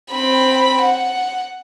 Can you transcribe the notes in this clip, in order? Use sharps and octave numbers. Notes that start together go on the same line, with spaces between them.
C4 B5
F#5